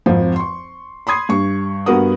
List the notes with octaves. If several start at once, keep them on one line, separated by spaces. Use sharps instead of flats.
G#1 F2 F3
C6 C#6
B5 C6 D#6 G#6 C7
G2 C#6
G2 B3 F#4 A#4 F#5 D#6